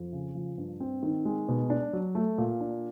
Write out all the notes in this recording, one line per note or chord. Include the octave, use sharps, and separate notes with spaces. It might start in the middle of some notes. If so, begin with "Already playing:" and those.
Already playing: F2
C#3
F3
G2
C4
D#3
G#3
B2
D4
F#3
A3
A#2
D4